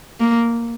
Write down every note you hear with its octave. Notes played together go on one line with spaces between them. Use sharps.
A#3